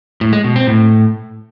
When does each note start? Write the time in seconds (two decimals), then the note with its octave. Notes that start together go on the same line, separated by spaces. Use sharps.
0.21 A2
0.33 G#3
0.44 B2
0.56 C4
0.67 A2